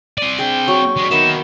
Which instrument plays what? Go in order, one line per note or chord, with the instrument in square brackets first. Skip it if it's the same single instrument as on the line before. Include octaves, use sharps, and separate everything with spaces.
[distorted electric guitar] C4 D5 [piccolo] D#7
[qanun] D4 G#4 [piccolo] G5
[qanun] F#3 [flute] C#6
[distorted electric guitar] G3 G#3
[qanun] D#3 B3 E5 [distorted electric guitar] A#3 D#4 [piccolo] E7